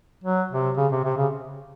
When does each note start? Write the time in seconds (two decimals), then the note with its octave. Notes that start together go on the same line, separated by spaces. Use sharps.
0.24 F#3
0.51 C3
0.77 C#3
0.92 C3
1.04 C3
1.17 C#3